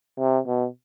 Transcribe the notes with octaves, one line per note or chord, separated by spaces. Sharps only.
C3
B2